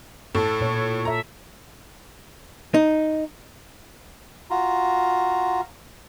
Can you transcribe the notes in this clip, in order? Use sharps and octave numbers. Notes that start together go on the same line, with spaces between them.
A2 A4
A#2 C#5
A4 E5 A#5
D#4
F4 F#4 A#5